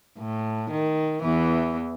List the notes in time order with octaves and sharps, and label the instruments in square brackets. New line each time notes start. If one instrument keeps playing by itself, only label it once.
[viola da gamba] A2
D#3
E2 E3